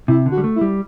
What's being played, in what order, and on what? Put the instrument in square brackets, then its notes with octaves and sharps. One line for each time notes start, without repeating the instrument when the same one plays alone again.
[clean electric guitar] C3 [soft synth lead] E4
[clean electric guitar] D3
[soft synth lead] F#4
[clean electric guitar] G3
A3
[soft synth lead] E4
[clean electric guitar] G3